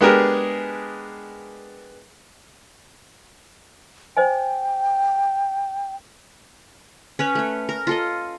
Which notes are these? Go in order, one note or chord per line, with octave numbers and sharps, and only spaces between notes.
G#3 B3 D4 G4 G#4 A#4
C5 D#5 G5 G#5
C#4 B4 C#5
A3 C#5
A#4
F4 A4 D#5